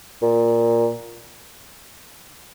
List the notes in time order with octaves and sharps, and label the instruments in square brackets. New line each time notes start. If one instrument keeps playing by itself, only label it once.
[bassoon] A#2